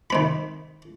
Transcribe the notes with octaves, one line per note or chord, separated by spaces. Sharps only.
D#3 C4 B5